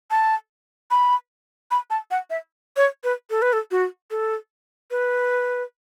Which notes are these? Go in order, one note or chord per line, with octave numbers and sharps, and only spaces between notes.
A5
B5
B5
A5
F#5
E5
C#5
B4
A4
B4
A4
F#4
A4
B4